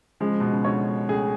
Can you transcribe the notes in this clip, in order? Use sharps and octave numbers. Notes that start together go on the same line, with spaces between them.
C#3 F3 G#3
B2
C#3
B2 D3 C#5
A2 C#3 G#4